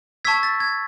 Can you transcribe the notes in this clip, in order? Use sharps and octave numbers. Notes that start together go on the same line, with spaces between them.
A5 C#6 E6 G#6 B6
A6
G#6